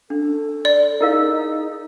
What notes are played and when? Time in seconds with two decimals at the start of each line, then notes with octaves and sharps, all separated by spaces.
0.10 D4 A4
0.65 D5
1.01 D#4 E4 G#4 A#4 F5